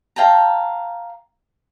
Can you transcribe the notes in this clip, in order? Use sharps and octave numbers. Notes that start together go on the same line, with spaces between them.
F5 G5 A5 A#5